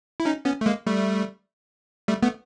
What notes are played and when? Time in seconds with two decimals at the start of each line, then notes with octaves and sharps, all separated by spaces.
0.20 E4
0.25 C#4 D#4
0.45 B3 C#4
0.61 A3
0.66 G#3 A#3
0.86 G3 A3
2.08 G3 A3
2.23 A3 B3